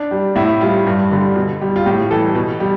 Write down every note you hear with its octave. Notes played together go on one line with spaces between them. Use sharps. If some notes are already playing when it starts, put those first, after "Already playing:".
Already playing: D4
G3
A2 E4
G3 F4
G2
D3 G3
B2
G3
F4
A2 G4
E3 G3 A4
B2
G3